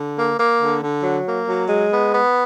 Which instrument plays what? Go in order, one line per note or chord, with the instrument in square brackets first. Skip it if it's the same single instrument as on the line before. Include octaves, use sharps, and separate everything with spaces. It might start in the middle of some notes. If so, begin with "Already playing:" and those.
Already playing: [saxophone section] D3
A#3
A#3
D3
D3
F#3
A#3
F#3
G#3
B3
B3